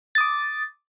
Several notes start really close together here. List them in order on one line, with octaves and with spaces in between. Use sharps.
A6 D#6 D6